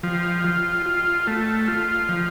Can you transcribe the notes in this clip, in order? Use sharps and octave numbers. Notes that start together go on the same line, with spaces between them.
F3
F4
F4
A3
F4
F3